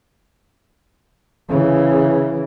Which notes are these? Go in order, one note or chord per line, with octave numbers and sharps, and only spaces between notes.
C#3 E3